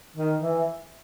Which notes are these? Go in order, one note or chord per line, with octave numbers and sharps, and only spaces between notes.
D#3
E3